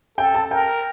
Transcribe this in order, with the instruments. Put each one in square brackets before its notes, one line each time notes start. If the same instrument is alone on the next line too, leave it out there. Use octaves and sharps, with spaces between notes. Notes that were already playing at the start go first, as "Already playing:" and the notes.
[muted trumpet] A4 [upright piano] G5
[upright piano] A5
[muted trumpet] A#4 [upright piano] G5